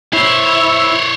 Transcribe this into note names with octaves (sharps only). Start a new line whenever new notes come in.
E4 C5 C#5